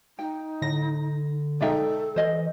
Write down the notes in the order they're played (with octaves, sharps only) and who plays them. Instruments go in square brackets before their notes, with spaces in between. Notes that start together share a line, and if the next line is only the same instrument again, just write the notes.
[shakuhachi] D#4 [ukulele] G5
[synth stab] A2 A#6 [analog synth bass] D3
[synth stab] B1 G#3 D#4 [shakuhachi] A4 [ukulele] D5 E5 G5
[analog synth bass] E3 [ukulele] C5 D#5